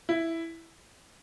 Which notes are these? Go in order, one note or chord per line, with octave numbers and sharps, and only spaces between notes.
E4